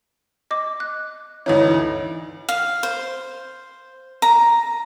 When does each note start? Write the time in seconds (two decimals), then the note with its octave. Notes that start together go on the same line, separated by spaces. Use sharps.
0.51 D#5 D6
0.80 F#6
1.46 D2 E3 D#4 C#5
2.49 F5
2.83 C5
4.22 A#5